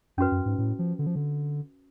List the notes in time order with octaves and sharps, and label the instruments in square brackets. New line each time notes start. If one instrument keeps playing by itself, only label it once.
[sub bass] F#2 [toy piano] C#4 F#4 B4
[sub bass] F#2
G#2
A2
F3
D3
F3
D3